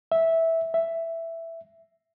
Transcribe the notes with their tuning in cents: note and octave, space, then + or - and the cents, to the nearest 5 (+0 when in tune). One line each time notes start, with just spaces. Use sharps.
E5 -10
E5 +5